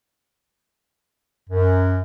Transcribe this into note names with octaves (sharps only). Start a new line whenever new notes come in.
F#2